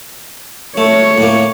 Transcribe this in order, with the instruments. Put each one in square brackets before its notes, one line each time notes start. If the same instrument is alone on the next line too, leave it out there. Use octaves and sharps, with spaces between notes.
[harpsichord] A3 [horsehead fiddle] C#5
[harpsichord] A2 A#3